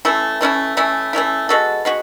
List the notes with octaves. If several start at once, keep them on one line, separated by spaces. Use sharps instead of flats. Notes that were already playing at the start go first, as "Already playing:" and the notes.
E3 A3 C#4 E4
E3 A3 C#4 E4
E3 A3 C#4 E4
E3 A3 C#4 E4
G#3 B3 F#4 A4
G#3 B3 F#4